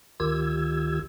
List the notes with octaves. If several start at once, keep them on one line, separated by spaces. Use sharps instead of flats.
D2 D#3 F4 G4 E6 G#6